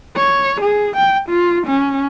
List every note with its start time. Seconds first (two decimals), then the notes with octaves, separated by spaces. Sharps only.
0.17 C#5
0.61 G#4
0.97 G5
1.29 F4
1.66 C#4